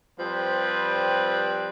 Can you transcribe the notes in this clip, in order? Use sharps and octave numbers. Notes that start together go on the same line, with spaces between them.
F3 G3 C4 G4 B4